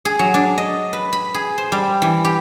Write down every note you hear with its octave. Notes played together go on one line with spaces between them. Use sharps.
G#4
F#3
D4
D#5
B4
B5
G#4
C5
G3
E3
G4